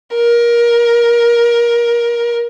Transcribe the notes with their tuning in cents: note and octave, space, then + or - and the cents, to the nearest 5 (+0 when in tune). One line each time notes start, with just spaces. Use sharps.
A#4 +20